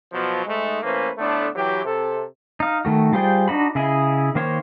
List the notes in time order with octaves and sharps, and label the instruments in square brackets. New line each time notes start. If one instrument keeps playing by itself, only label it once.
[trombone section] B2 F3 F#3
G#2 G#3 A3
E3 A3 A#3 C#4 B4 C5
A2 D3 A3 B3 D4
E3 F#3 G4
C3 A4
[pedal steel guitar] D#4 F5
D#3 A3 F#4
G3 F4 G#4 C5 G5
D4 D#4 F#4 B5
C#3 E4 G#4 D#5
D#3 A#3 C5 C#5